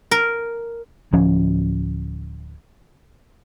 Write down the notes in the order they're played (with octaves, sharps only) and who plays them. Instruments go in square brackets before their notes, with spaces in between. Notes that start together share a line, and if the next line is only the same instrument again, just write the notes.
[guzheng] A#4
[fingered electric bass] D1 F3 C#4